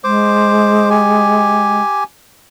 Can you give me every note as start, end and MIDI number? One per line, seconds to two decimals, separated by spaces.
0.04 1.82 56
0.04 0.89 72
0.04 0.89 86
0.90 2.04 67
0.90 2.04 80